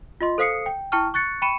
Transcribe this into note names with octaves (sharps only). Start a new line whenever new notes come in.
F4 D#5 C6
A4 C5 F5 D#6 C7 C#7
G5
E4 G5 A5 C#6 F6
C#6 F#6 A6 C#7
G5 B5 C#6 C#7 D#7 E7